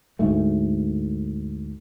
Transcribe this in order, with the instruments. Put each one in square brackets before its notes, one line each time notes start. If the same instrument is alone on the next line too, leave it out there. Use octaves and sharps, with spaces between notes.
[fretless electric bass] D2 G#2 A3